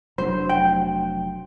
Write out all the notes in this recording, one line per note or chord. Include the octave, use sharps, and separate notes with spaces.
F1 F#3 D4 C5
G5